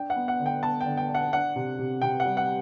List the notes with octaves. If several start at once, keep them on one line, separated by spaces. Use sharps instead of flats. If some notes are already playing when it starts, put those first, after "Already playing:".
Already playing: D4 G5
F#5
B3
F#5
D3
G5
B3 A5
G5
D3
G5
D4
F#5
D4 F#5
C3
C3
C3 G5
F#5
G3
F#5